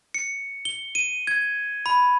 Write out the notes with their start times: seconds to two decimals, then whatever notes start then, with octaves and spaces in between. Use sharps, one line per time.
0.14 C#7
0.65 G7
0.95 D#7
1.27 G#6
1.86 B5